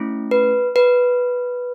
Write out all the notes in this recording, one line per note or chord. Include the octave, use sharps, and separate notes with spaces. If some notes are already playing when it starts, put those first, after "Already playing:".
Already playing: A3 C#4 E4
B4
B4